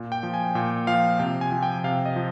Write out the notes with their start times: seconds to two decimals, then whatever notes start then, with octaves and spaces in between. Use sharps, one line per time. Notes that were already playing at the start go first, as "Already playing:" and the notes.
Already playing: A#2
0.12 G5
0.23 F3
0.34 G#5
0.55 A#2 G5
0.87 F3 F5
1.19 C3 G5
1.41 G#5
1.52 F3
1.63 G5
1.84 C3 F5
2.05 D#5
2.16 F3